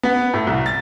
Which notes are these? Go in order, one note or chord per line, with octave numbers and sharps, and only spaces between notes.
B3
A2
C2
A6